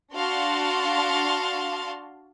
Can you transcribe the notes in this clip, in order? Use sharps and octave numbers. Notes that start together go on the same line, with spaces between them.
D4 F#4 F5 A5 C6